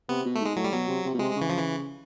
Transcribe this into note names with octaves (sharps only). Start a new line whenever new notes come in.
C3 B3
B2
A3
G#2 G#3
A2 F#3
G3
B2 F#3
C3
C3
B2
C3 G#3
G#3
C#3
E3
F3
E3